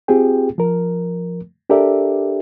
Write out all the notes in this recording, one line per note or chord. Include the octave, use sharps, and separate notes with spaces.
C4 F4 G4 G#4 G5
F3 A#4
D4 G4 A4 A#4 D5 E5